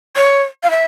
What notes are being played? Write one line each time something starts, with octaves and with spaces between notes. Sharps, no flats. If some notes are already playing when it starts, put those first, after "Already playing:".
C#5
F5
E5